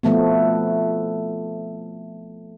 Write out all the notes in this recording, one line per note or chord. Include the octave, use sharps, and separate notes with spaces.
F3 A3 B3